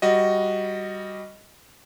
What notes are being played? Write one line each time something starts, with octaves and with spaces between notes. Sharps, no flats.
G3 F#4 D#5